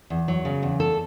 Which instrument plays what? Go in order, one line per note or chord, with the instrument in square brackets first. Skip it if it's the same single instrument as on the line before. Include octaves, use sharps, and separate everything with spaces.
[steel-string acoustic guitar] E2
F#3
C#3
E2
A4